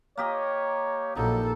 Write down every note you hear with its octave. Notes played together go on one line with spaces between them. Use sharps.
A#3 G4 C#5 D#5
A#1 F#3 D#4 A4